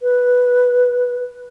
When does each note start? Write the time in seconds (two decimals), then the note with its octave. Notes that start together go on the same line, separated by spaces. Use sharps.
0.01 B4